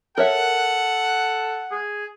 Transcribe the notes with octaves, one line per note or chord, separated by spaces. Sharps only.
A4 A#4 C#5 E5 F#5
G#4